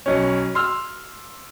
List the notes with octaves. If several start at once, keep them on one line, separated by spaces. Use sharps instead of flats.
B1 C#4
C6 E6 F6